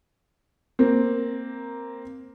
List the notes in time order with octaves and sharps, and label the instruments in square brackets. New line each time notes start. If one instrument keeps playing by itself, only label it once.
[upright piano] A#3 C4